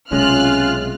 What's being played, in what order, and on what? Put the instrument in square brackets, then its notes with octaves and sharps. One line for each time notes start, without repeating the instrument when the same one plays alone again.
[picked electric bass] B1 C3 G#3 [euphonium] C#4 [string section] F4 F6 F#6